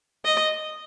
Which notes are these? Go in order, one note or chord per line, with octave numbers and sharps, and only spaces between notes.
D#5